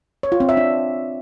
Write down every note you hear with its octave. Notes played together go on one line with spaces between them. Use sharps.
C#5
F4
C4
E5
D4